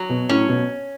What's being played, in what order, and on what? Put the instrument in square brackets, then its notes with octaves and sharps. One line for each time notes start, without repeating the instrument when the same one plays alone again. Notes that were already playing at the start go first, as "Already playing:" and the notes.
Already playing: [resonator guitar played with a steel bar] F#3
[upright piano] B2
[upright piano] A2 [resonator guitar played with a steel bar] C#4
[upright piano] B2